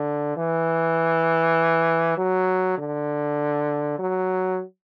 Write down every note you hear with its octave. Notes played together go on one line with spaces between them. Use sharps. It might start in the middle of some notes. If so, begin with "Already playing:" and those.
Already playing: D3
E3
F#3
D3
F#3